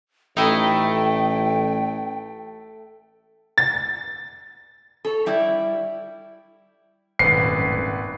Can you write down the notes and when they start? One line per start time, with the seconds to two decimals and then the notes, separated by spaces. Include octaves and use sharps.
0.37 A1 A3 D#4 E4 G5
3.58 A6
5.05 A4 C#5
5.26 G3 E4 D5
7.19 D#1 G#1 F#2 A2 B4 C7 C#7